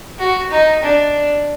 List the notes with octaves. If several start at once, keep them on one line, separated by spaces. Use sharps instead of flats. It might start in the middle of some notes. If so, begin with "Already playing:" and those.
F#4
D#4
D4